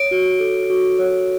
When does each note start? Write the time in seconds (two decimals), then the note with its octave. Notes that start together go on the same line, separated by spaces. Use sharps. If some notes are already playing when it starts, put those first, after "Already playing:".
Already playing: C#5 D7
0.11 F#4
0.40 A4
0.70 F#4
0.99 C#5